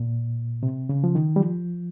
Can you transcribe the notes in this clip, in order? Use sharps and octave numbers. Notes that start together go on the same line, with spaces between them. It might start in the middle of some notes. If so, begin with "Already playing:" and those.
Already playing: A#2
C3
C#3
F3
D#3
G3
F3